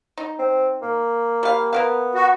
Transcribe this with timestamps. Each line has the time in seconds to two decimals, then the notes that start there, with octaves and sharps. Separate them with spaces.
0.18 D#4
0.39 C4
0.82 A#3
1.43 G3 F5
1.73 A#3 B3 A#4 F5
2.15 F#4